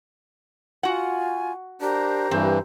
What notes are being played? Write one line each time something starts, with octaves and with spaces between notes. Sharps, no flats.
F4 F#4 F#5 G#5
D4 G4 A#4 C5 A#5
G2 E3 C4